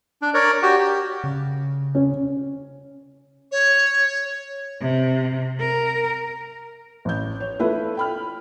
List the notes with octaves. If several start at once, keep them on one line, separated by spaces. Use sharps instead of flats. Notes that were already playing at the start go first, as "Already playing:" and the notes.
D4
A#4 C#5 D5
F#4 G4
G4
C#3
C#4
C#5
C3
A#4
A1 G6
C#5
A3 E4 F4 B4
G5 B5 F6